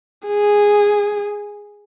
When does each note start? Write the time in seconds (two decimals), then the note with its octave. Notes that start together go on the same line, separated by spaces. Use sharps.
0.28 G#4